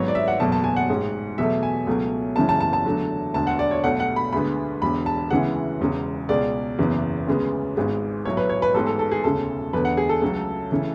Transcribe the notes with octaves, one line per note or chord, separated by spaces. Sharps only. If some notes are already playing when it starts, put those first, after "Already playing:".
Already playing: G#1 G#2 F#3 B3 C#5
D5
E5
F#5
F#1 E2 B2 F#3 A3 A5
A5
G#5
F#5
A1 G#2 G#3
E2 B2 F#3 A3 E5
G#5
C#2 B2 F#3 A3
F#1 F#2 C#3 E3 A5
A5
A5
A5
E2 D3 F#3 A3
E1 D2 D3 A5
F#5
D5
C#5
B1 B2 A3 F#5
F#5
B5
D2 D3 G#3 B3 B5
E1 E2 D3 B5
A5
D2 C#3 E3 G#3 B3 F#5
E1 E2 C#3 G#3
C#2 B2 G#3 D5
F#1 E2 C#3 E3 B3
D2 C#3 G#3 B3
G#1 G#2 G#3 B3
B1 A2 F#3 C#5
B4
C#5
B4
A1 G#2 G#3 B3 A4
A4
A4
G#4
E1 D2 C#3 G#3 A4
E1 E2 D3 A3 B4
F#5
G#4
A4
C#2 C#3 F#3 A3
C#3 E3 A3